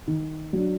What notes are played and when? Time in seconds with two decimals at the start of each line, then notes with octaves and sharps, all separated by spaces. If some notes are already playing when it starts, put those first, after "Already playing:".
0.08 D#3
0.53 F#3 D4